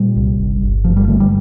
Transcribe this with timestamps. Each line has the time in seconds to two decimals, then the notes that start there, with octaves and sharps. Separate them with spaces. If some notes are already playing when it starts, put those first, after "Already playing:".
Already playing: A#2 G3
0.16 C2
0.39 G1
0.62 G1
0.84 G2 F3
0.97 G3
1.08 D3 A3
1.20 G3